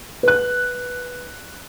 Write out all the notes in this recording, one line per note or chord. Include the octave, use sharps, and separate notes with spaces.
B4 F#6